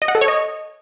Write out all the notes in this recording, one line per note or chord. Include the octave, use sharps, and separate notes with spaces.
D#5
F#5
A4
C#5
D#5